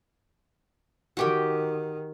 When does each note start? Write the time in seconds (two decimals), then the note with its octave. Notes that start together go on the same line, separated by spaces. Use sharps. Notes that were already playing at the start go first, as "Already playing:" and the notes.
1.17 D#3 F#4 G4 G5